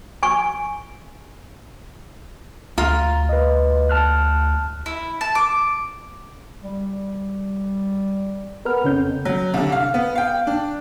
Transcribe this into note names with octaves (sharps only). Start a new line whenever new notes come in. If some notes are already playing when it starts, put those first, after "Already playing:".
G#5 C#6
D2 F4 A#5
B4 D#5
A5 F6 F#6
E4
A5
D6
G3
B3 A#4 B4 F6
F2 C#3 C#4 G6
F#3
C2 D3
F5
B3
F5 G5
D4